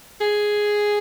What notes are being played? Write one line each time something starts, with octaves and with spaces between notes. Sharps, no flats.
G#4